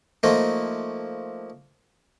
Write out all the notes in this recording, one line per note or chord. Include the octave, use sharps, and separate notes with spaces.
F3 A3 A#3 D#4 D#5